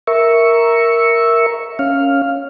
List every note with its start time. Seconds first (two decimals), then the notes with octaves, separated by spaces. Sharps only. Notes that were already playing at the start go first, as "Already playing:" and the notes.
0.07 A#4 E5 C#6
1.79 C#4 F5